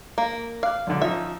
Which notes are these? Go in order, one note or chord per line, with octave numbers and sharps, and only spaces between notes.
A#3
F5 D6 F#6
B1 G#2 D3
F3 C#4 D#4 E5